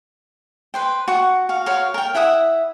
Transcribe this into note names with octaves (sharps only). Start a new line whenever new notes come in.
B4 C5 G5
F#4 F#5
F#4 F5
F#4 A#4 C#5 F5
A#4 G5
E4 E5 F#5 D#6